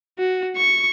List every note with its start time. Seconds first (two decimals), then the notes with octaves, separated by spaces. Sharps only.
0.19 F#4
0.58 C#6